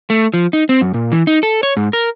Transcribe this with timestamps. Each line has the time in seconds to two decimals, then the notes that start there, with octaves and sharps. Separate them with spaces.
0.10 A3
0.34 F3
0.53 D#4
0.69 C4
0.81 F#2
0.94 A#2
1.12 E3
1.27 D#4
1.43 A4
1.63 C#5
1.77 G#2
1.93 A#4